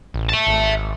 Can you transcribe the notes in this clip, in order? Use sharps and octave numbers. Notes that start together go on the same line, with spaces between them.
A1
E5 A5
G#1